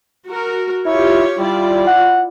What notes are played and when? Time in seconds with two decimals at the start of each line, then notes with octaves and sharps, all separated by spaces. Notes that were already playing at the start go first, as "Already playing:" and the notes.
0.27 F#4 A#4
0.86 E4 F4 G4 C#5
1.39 G3 E4 F4 D5
1.87 F#5